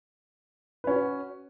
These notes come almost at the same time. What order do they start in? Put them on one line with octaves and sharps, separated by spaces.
B4 C#4 F#4